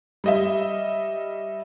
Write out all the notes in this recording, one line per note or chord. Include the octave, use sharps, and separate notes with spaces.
G3 D#5 E5